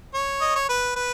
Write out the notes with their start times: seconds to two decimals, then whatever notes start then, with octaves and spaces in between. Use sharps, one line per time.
0.14 C#5
0.41 D#5
0.56 C#5
0.69 B4
0.96 B4